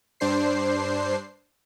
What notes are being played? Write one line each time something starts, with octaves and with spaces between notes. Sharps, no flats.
G2 D4 C5 C7